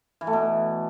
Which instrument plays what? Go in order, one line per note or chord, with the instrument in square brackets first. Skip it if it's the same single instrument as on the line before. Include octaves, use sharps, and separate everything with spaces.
[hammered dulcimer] E3
A3
B2